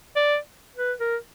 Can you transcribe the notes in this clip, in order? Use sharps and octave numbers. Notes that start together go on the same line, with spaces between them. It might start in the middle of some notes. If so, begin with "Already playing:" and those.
D5
B4
A#4